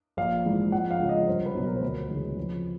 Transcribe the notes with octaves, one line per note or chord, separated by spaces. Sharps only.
A#1 F5
G#2 E3 G#3
F2 F#5
F5
C#3 F3 G#3
D#5
C2 C5
B4
B2 F#3
A#4
C5
D2 B4
C#3 E3 G#3
F2